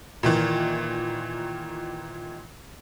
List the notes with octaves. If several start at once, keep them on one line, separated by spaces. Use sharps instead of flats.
A#2 D#3 E3